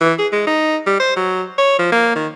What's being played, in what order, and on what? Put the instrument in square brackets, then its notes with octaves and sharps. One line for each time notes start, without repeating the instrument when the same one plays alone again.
[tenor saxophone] E3
G#4
G#3
D#4
G3
C5
F#3
C#5
F3
A#3
D#3